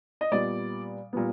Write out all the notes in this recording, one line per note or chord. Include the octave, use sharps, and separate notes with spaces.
D#5
A#2 G3 B3 D5
A#2 G3 B3